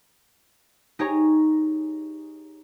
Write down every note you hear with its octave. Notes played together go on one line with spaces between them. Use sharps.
D#4 G4 G#4 C#5 A#5